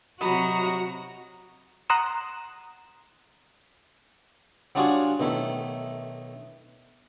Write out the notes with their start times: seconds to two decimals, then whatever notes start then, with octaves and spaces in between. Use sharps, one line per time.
0.21 C3 F#3 F#4 D#5 A#5 B5
1.90 F#5 A#5 C6 D#6 E7
4.75 F#3 G3 D4 F4 F#4 G#4
5.20 B1 D#3 A3 E4